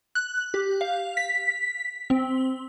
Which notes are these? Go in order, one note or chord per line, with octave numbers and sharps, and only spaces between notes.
F#6
G4
F5
B6
C4